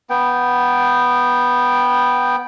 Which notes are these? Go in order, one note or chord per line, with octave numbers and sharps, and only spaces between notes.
B3 G5